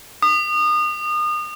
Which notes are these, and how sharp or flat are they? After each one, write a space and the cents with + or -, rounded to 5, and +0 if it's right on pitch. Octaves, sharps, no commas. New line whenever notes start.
D#6 -35